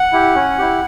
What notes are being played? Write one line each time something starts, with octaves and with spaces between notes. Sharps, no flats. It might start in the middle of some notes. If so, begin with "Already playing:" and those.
Already playing: F#5
E4 G4
C#4
E4 G4